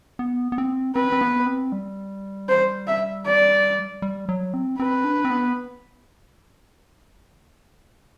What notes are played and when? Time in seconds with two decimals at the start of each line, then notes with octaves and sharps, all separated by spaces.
0.19 B3
0.52 B3
0.58 C4
0.95 C4 B4
1.12 C4
1.21 B3
1.46 C4
1.72 G3
2.49 C5
2.87 E5
3.26 D5
4.02 G3
4.29 F#3
4.54 C4
4.79 C4 B4
5.04 D4
5.25 C4
5.30 B3